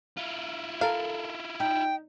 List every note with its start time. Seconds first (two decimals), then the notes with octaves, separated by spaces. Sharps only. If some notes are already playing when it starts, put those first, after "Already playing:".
0.17 E4 F4
0.81 A4 A#4 F5
1.60 D#4 G5